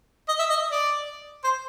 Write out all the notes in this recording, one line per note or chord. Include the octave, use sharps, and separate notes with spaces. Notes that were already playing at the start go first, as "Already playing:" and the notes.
D#5
E5
D#5
D5
C5